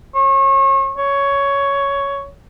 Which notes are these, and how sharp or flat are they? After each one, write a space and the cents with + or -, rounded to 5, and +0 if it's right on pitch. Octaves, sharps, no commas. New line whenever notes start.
C#5 -35
C#5 +10